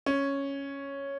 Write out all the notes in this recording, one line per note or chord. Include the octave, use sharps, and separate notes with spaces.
C#4